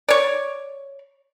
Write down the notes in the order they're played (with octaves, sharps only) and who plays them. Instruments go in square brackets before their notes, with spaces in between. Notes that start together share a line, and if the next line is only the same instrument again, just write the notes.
[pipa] C#5 D5